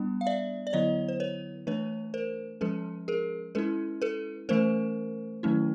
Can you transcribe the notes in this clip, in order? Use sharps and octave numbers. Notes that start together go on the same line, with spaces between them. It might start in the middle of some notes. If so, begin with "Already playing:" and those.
Already playing: G3 B3 D4
F5
D5 E5
D5
D3 F#3 B3 E4 C#5 D#5
C5
B4 C#5
E3 A3 D4 B4 C#5
A#4 C5
F3 G#3 C#4 A4 B4
G#4 A#4
G#3 C#4 E4 A4 B4
A4 B4
E3 A3 C#4 A#4 C5
D#3 F#3 A3 C#4 E4